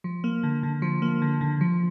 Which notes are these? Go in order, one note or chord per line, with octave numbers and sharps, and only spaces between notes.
F3
A#3
D3
D3
F3
A#3
D3
D3
F3